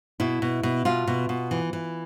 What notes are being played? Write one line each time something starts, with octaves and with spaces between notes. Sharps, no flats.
B2 E4
B2
B2
B2 F4
B2
B2
E3
E3